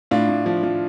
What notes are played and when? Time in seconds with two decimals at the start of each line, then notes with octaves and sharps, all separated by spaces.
0.11 A2 D4 F4
0.29 A2
0.46 F3
0.63 F3